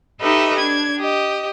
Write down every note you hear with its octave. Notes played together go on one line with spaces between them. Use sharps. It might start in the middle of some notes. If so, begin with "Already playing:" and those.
D#4 G4 A4 B4 D#5 E5
D4 G#6
G4 D#5